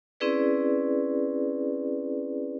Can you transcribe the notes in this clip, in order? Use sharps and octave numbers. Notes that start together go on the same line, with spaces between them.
C4 C#4 E4 G#4 B4 D5